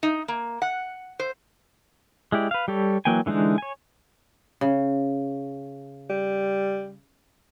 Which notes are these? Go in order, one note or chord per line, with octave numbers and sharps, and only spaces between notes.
D#4
A#3
F#5
C5
G#3 E4 G4 D5
B4 F5
G3 G4 A4 C#5
E3 F#3 A#3 G5 G#5
D3 E3 G#3 D4 D#4
C#5 G#5
C#3
G3